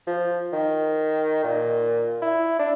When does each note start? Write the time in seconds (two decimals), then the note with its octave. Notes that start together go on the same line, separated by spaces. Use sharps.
0.07 F3
0.53 D#3
1.44 A#2
2.22 E4
2.59 D4